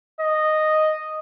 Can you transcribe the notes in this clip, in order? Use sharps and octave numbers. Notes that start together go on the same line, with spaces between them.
D#5